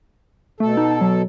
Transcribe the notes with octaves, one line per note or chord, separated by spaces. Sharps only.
B2 A3 A4
D#4
F#3